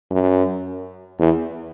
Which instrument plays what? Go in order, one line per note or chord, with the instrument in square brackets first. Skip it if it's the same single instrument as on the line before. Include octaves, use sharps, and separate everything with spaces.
[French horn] F#2
E2